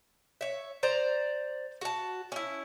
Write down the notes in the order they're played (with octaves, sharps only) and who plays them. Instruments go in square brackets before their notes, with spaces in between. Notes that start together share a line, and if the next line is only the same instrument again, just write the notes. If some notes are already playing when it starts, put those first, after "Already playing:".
[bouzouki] C#5 E5
C5 D5 A#5
F#4 A5
C#4 E4